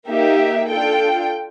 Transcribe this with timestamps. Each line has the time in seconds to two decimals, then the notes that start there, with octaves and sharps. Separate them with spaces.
0.09 A#3 D#4 G4 E5
0.70 D4 F4 A4 G5